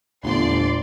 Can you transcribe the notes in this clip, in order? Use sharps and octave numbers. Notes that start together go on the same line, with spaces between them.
G1 E2 A#2 A3 D5 C6